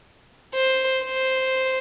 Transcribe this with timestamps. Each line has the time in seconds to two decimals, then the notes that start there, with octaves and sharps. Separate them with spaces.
0.54 C5
1.04 C5